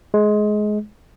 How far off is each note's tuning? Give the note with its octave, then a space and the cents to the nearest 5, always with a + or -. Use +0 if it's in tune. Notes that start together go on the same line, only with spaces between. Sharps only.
G#3 +20